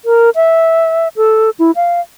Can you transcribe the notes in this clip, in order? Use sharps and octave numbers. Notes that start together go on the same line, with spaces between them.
A#4
E5
A4
E4
F5